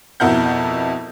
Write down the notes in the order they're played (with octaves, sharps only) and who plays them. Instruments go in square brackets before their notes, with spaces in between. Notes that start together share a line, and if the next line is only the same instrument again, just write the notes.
[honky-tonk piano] F2 B2 E4 A#4 F#5 G6